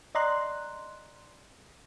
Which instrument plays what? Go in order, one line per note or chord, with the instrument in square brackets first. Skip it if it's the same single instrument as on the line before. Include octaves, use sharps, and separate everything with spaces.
[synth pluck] D5 D#5 A#5 C6 F#6